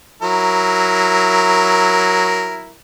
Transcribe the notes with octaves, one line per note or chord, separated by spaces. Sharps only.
F#3 E4 A#4